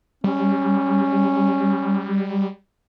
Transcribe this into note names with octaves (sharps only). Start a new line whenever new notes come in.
G3 C#4